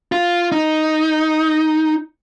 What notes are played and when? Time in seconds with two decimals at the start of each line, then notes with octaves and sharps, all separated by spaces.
0.12 F4
0.52 D#4